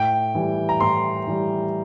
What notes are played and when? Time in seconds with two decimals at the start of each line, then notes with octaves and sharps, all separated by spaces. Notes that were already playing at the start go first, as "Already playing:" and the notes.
Already playing: A2 G5
0.35 E3 G3
0.69 A#5
0.80 A2 C6
1.27 E3 G3